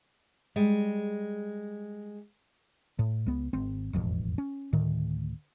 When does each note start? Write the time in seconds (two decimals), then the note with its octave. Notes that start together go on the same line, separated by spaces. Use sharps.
0.56 G3 G#3
2.99 A2
3.26 C#2 B3
3.53 G#1 C4
3.93 E1 A1 F2
4.38 C#4
4.73 D2 A2 D#3